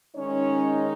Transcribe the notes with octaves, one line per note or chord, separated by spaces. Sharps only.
D#3 G#3 C#4 D#4 C#5